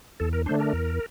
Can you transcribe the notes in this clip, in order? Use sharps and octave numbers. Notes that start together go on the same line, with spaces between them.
E2 A4
A#4
D3 A3 D4 C5
A#4
E2